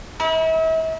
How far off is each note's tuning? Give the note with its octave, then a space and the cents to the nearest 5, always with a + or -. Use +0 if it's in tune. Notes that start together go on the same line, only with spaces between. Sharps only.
E4 -40